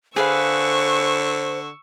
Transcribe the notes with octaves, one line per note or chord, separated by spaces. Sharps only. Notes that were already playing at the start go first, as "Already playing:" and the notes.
D3 G#4 B4 C5 F5 C#6 E6